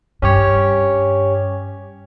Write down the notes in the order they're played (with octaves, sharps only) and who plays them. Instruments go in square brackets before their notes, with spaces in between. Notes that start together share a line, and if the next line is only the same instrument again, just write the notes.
[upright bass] G2 [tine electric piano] C#4 G4 C#5